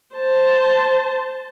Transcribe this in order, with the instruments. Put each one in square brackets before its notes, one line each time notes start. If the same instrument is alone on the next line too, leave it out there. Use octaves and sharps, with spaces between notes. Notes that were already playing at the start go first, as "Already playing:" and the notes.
[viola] C5 A5